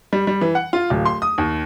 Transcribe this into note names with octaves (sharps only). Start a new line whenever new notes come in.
G3
G3
E3
F#5
F4
D1
C6
D#6
D#2